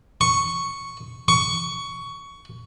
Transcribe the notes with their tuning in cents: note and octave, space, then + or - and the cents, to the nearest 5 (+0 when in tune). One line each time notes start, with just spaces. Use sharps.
C#6 +0
C#6 +15